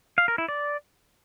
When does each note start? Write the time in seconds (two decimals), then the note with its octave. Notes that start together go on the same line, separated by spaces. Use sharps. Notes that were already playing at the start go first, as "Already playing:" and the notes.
0.18 F5
0.28 A#4
0.38 E4
0.48 D5